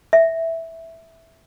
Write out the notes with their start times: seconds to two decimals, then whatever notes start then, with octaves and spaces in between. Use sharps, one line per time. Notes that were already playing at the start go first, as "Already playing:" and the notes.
0.13 E5